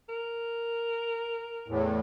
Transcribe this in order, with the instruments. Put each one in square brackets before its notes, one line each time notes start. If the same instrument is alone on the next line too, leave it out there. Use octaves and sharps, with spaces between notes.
[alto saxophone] A#4
[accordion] E2 A2